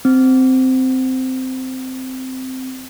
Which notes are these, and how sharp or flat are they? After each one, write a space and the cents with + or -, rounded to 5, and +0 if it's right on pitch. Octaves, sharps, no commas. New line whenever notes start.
C4 -10